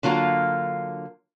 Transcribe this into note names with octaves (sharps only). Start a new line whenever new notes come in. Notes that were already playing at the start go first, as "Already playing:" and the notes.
D3 F#3 A#3 F4